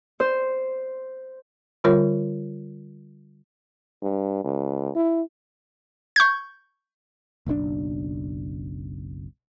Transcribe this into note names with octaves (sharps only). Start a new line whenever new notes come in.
C5
D3 G3 F4 A#4 C#5
G2
C#2
E4
C#6 G6 G#6
F#1 B1 C#3 D4